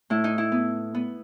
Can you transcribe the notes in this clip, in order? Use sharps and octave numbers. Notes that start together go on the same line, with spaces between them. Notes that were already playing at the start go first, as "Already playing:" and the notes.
A2 E4
D#4
E4
B3
B3